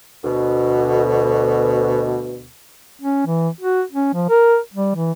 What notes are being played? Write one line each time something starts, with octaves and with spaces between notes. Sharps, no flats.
D2 B2
C#4
E3
F#4
C#4
F3
A#4
G3
E3